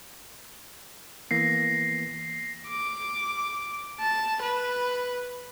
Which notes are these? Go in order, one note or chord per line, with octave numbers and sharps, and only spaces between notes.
E3 A#3 B3 A#6 C7
D6
A5
B4